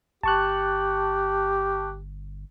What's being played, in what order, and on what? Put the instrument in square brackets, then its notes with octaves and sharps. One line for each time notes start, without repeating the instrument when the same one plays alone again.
[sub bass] G1 [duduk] G4 [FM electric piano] A5 C#6 F#6